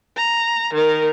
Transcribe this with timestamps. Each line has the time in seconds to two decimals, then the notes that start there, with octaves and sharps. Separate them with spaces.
0.17 A#5
0.74 D#3 A#4